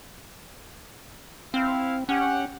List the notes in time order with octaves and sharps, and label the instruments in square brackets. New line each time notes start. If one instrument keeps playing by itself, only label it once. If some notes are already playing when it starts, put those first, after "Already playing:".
[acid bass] C4 [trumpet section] E4 F5
[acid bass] C#4 [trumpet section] G4 F#5